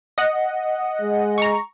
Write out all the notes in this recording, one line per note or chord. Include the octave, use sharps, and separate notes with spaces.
D#5 F#5
G#3
A#5 C#6